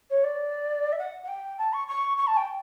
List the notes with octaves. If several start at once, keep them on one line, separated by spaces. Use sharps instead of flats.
C#5
D5
E5
F#5
F#5
G5
A5
C#6
C#6
C#6
A5
G5